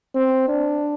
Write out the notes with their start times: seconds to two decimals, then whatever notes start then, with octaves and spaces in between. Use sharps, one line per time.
0.15 C4
0.48 D4